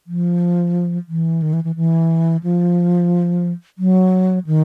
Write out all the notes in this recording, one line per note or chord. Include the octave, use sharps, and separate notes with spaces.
F3
E3
D#3
E3
E3
E3
F3
F#3
D#3